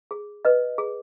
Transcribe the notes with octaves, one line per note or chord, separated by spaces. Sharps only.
G#4
B4 D#5
G#4